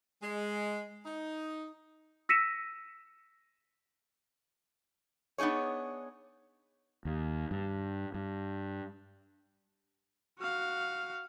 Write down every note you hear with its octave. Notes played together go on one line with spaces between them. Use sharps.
G#3
D#4
E6 A#6 B6 C#7 D#7 E7
B3 D4 D#4 G#4 C#5
D#2
G2
G2
F#4 F5